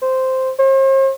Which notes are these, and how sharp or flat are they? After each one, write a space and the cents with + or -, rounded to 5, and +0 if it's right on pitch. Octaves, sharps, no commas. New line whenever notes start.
C5 -5
C5 +45